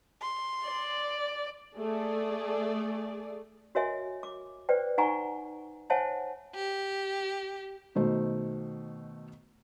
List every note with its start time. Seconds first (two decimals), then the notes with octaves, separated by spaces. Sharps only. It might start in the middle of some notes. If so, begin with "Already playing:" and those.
0.21 C6
0.68 D5
1.78 A3 G#4 D5
3.75 F#4 A#4 C#5 D#5 E5 G#5
4.23 D6
4.69 B4 C5 D5 G5
4.98 D#4 F#5 G#5 A#5 C#6
5.90 C5 C#5 E5 F#5 G#5 A5
6.55 G4
7.95 B2 D#3 A3 C5